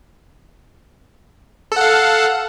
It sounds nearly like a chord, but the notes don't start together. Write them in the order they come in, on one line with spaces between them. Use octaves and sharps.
A4 F#5 F5